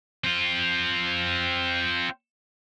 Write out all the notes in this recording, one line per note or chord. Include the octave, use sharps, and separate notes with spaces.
C4 F4